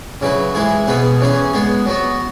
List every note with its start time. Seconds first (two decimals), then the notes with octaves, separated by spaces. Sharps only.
0.22 C#3 F#3 E4 B4
0.55 E3 G#3 E4 G#4
0.87 B2 B3 G#4 B4
1.20 E3 C#4 G#4 B4
1.53 G#3 B3 G#4
1.86 F#3 B3 F#4